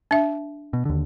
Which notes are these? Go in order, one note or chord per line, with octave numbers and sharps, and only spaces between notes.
D4 E5
B2
D#2 D3